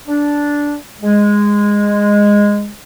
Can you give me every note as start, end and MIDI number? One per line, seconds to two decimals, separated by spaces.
0.07 0.75 62
1.02 2.69 56